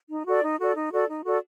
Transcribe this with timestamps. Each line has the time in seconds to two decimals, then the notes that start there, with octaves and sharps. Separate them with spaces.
0.10 D#4
0.27 F#4 A4 D5
0.43 D#4
0.60 F#4 A4 D5
0.75 D#4
0.91 F#4 A4 D5
1.08 D#4
1.25 F#4 A4 D5